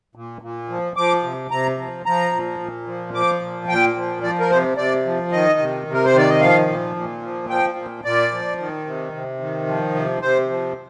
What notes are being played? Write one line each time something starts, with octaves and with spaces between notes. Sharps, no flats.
A#2
A#2
F3
F3 D6
C3
C3 A#5
F3
F3 A#5
A#2
A#2
F3
F3 D6
A#2
A#2 G5
F3
F3 D5
A#4
C3 C5
C3 D5
F3
D#3 D#5
C3
C3
A#4
C5
D#3 D5
D#5
F3 F5
A#2
A#2
F3
F3 G5
A#2
A#2 D5
F3
D#3
C3
C3
D#3
F3
C3
C3 C5
F3